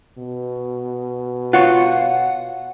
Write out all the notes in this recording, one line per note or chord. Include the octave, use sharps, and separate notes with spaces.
B2
F4 C#5 F#5